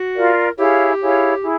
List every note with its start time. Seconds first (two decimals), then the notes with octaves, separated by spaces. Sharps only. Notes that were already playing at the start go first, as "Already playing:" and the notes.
Already playing: F#4
0.15 F4 A#4 D5 F5
0.58 E4 G4 G#4 C#5 F5
1.00 E4 G#4 C#5 F5
1.42 E4 G#4